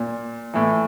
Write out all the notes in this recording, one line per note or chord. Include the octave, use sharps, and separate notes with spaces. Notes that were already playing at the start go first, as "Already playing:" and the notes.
Already playing: A#2
A2 E3